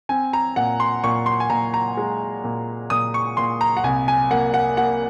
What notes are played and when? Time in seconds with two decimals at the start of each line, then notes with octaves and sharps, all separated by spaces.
0.09 C4 G#5
0.33 A#5
0.56 A#2 F#5
0.80 C6
1.04 A#2 C#6
1.26 C6
1.40 G#5
1.50 A#2 A#5
1.74 A#5
1.97 G#3
2.44 A#2
2.90 A#2 D#6
3.14 C#6
3.37 A#2 C6
3.61 A#5
3.77 F#5
3.84 C2 G#5
4.08 G#5
4.31 A#3 F#5
4.54 F#5
4.77 A#3 F#5